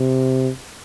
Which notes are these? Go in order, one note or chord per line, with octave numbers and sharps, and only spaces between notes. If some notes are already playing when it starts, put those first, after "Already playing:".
Already playing: C3